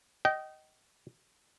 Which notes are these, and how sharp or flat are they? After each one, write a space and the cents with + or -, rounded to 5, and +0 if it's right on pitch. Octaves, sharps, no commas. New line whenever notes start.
D#5 +0 G5 -30